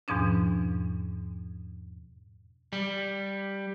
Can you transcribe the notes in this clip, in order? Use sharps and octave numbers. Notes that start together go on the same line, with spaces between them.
E2 G#2 B2 F3 C#4 D4
G3